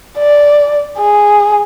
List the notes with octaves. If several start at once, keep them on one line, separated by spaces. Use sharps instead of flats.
D5
G#4